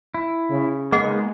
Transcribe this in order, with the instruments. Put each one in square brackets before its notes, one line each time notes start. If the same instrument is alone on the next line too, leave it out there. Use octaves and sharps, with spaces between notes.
[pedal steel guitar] E4
[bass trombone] C#3
[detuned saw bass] G#3 [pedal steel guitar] A#3 B3 D#4 [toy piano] G#4 D#5 F#5